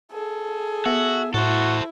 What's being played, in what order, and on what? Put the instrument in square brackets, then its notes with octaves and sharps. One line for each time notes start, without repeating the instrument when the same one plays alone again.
[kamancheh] G#4 A4
[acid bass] B3 [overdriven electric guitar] F#4 [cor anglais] E5
[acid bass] A2 [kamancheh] E4 [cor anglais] F#4 [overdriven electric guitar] A4 C5